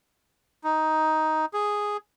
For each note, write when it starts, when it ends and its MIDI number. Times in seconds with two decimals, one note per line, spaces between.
0.64 1.46 63
1.54 1.97 68